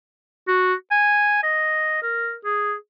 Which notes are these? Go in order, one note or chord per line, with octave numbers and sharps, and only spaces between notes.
F#4
G#5
D#5
A#4
G#4